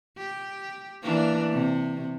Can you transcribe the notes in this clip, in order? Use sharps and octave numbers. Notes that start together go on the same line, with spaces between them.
G4
E3 A#3 D4
C3